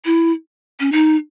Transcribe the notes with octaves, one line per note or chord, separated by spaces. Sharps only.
E4
C#4
D#4